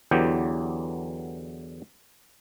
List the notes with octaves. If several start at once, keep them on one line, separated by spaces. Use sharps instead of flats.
E2 D3 E3 F#3 G4 G5